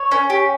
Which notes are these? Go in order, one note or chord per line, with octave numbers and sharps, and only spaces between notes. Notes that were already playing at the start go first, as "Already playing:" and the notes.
Already playing: C#5
C#4
G4